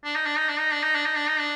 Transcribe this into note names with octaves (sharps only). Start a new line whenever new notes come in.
D4
D#4
D4
D#4
D4
D#4
D4
D#4
D4
D#4
D4
D#4
D4